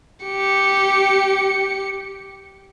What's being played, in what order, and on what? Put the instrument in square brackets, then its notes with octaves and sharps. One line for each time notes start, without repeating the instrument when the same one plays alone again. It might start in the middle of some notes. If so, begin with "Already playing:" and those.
[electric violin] G4 C#7